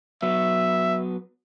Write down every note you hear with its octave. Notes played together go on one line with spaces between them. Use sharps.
F#3 B3 E5